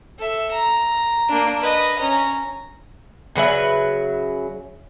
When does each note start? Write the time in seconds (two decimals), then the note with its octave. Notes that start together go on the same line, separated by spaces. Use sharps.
0.18 A4 E5
0.51 A#5
1.28 A#3 D4
1.61 B4 D#5
1.99 C#4 A#5
3.36 C#3 F#3 B4 E5